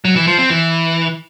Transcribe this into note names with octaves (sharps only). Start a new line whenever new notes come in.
F#3
E3
F3
C4
E3